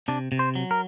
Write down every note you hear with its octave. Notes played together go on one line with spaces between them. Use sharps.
C3 D4
C3
C5
F#3
A#4